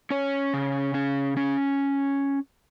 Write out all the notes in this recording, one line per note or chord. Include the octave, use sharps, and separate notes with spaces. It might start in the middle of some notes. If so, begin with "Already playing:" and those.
C#4 C#5
C#3
C#4
C#4